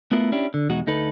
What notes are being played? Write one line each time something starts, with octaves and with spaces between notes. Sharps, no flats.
A3 B3 E4 F4 A#4
C#4 D4 E4 G4
D3
E2 B2 G#3 D#4 F#4
D2 D#4 A4 B4